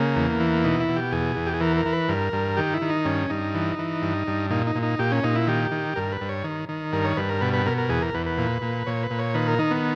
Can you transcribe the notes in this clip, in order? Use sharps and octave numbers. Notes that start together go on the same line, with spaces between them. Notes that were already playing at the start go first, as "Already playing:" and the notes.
Already playing: C#3 A#3
E2
E3
B2 D#4
E4
B2
G4
E2 G#4
E2
G4
G#4
E3 A#4
A#4
E3
B4
G2 A#4
G2
D#3 G4
E4
D#3
D#4
G2 C#4
G2 D#4
E3
E3
G2
G2
A#2 D#4
D#4
A#2
D#4
A#2 G4
C#4
A#2 D#4
E4
D#3 G4
D#3
G2 A#4
B4
G2
C#5
D#3
D#3
G2 A#4
C#5
G2 B4
A#4
B2 B4
B4
B2 A#4
A#4
E2 G#4
A#4
E2 B4
B4
A#2
A#2
A#2 C#5
B4
A#2
C#5
D#3 B4
A#4
D#3 D#4
B3